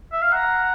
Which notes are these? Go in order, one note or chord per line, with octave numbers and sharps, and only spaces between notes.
E5
F5
F#5 A#5